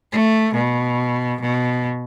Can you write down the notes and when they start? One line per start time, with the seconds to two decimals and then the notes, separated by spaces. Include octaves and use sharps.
0.12 A3
0.54 B2
1.41 B2